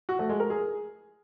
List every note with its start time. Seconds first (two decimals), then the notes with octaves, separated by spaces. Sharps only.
0.09 F#4
0.19 A3
0.29 G#3
0.40 A#4
0.50 G#4